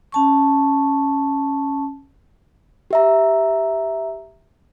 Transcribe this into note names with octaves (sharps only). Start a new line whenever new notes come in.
C#4 A5 C#6
G4 E5 A#5